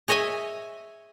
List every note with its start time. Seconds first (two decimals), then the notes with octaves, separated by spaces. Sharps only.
0.08 G#4 C#5 D#5 E5 G#5